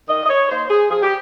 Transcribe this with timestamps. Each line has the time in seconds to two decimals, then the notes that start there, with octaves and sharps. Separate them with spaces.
0.08 D#3 D#5
0.24 D#5
0.27 C#5
0.48 A#3 D#4 C5
0.68 G#4
0.89 F3 G#4
1.01 G4